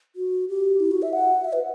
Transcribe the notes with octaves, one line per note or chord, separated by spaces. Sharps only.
F#4
G4
E4
F#4
E5
F#5
E5
B4